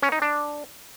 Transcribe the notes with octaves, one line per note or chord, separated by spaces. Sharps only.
C#4
D#4
D4